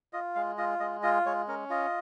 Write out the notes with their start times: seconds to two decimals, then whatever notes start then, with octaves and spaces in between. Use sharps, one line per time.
0.13 F4 D#5
0.35 G#3 F5
0.58 F4 D#5
0.80 G#3 D#5
1.03 F4 D#5
1.26 G#3 C#5
1.48 C#4 A#4
1.70 F4 D#5